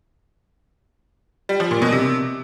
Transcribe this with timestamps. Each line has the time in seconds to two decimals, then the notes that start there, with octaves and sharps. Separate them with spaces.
1.49 G3
1.60 F3
1.71 A#2
1.82 B2
1.92 C3